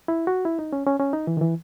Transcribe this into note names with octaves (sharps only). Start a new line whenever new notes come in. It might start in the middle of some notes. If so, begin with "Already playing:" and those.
E4
F#4
E4
D#4
C#4
C#4
C#4
D#4
E3
D#3
E3